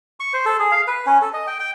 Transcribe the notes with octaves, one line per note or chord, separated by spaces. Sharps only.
C#6
C5
A4
G#4
F5
B4
C#4
A4
D#5
G5
G5